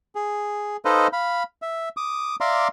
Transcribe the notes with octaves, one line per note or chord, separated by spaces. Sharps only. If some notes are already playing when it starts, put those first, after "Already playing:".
G#4
D#4 A4 B4 C5 D#5 F5
F5 B5
E5
D6 D#6
D5 E5 F5 A#5 C6 D6